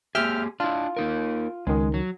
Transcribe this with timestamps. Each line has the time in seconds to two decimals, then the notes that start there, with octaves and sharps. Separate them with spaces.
0.15 A#3 G4 G#4 E5 G5 F6
0.60 D4 E4 F4
0.97 A#3 D#4 A#4
1.67 C#2 D#3 G#3
1.94 F#3